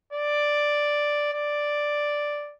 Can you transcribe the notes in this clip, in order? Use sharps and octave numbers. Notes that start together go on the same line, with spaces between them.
D5
D5